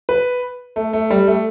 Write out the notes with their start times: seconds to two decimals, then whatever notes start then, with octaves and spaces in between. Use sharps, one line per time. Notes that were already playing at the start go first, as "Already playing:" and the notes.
0.09 B4
0.76 A3
0.93 A3
1.10 G3
1.27 A3